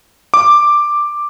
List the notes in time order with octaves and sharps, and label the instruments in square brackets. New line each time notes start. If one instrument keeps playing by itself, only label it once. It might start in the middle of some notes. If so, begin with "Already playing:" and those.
[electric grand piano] D6